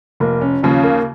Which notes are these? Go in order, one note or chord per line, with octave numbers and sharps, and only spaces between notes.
F1 A#3
C#4
D#2 C#3 F3 C#4
A#3